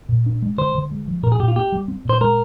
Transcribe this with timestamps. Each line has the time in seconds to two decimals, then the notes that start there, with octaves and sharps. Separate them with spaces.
0.09 A#2
0.26 D4
0.42 G#3
0.58 D3 C5
0.75 D3
0.91 G#3
1.08 F3
1.23 A#2 A#4
1.32 G#4
1.39 A#2 G4
1.48 F4
1.56 A#3 G4
1.72 G3
1.88 C4
2.05 A#2 C5
2.21 G#3 A#4